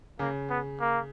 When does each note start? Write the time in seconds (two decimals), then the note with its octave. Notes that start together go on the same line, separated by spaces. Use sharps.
0.19 C#3 A#3
0.50 B3
0.81 A#3